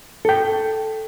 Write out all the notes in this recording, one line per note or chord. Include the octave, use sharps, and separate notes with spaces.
A4 G5